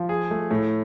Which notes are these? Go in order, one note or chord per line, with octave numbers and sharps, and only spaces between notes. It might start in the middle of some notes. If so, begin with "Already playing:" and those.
Already playing: F3
G#4
A3
A2